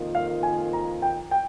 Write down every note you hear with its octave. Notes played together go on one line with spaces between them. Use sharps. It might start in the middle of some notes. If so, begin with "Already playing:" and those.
Already playing: F2 D#3 A#3 F4
F5
G#5
A#5
G5
G5